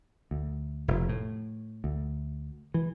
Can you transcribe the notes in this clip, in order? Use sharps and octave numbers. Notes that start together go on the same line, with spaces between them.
D2
F1
A2
D2
E3